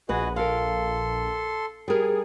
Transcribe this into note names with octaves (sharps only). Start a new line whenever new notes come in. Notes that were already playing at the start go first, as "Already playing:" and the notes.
A#1 B3 F#4 G#4 B4 D#5
A4 A#4 F5 C6
G3 G#4 A#4